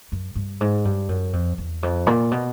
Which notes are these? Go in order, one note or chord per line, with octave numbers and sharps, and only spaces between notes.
F#2
G2
G#2
G2
F#2
F2
E2
F2
A#2
B2